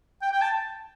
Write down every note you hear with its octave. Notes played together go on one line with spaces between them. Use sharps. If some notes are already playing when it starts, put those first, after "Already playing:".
G5
G5
A5